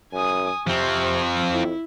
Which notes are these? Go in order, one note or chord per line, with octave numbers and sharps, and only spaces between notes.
F#2 G#5 D#6
C3 F3 C4 C#6
F2 E4